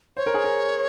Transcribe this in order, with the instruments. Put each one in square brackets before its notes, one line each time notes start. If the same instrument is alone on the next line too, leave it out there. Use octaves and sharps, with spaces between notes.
[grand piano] C5 [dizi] C#5
[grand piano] A#4
G#4
A#4